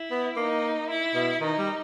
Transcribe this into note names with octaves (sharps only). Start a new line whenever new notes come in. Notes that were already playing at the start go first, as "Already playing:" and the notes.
Already playing: E4
B3
A#3 D#4
E4
B2
D#3 D#4
G3